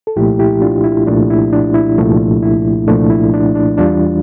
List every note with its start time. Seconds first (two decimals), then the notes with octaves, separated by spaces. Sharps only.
0.07 A4
0.16 C2 A#2 F3 A3 E4 G4
0.39 E4 G4
0.62 D4 F4
0.84 E4
1.07 C2 A#2 F3 A3 D4
1.30 E4
1.53 D4
1.74 E4
1.98 C2 A#2 F3 A3
2.43 E4
2.88 C2 A#2 F3 A3 D4
3.10 E4
3.34 D4
3.55 D4
3.78 E2 E3 G3 D4 F4